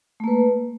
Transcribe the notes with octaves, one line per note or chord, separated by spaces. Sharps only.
A3 A#3 B4